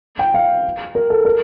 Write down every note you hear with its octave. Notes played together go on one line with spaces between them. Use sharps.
G5
F5
A#4
A4
A#4